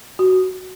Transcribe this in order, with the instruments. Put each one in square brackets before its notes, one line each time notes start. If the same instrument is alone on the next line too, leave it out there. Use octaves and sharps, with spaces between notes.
[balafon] F#4